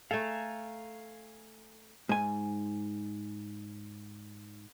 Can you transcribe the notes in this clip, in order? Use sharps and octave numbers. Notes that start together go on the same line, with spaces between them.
A3 A4 F5 G#5 A#5
G#2 G#5